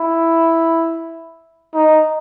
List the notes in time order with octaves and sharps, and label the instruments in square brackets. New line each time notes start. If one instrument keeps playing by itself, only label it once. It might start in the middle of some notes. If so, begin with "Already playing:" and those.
Already playing: [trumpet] E4
D#4